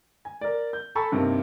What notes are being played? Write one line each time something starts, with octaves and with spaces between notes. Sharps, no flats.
G#5
A#4 D5
G6
A4 G#5 A5 B5 C#6 E6
G2 C3 D#3 A#3